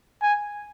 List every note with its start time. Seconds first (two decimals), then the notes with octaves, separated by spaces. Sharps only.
0.22 G#5